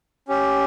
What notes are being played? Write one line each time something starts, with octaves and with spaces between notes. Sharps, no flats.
C#4 G4